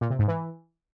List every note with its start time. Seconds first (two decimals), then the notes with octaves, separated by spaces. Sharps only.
0.01 A#2
0.10 C3
0.19 G#2
0.28 E3